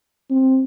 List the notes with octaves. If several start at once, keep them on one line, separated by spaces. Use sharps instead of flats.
C4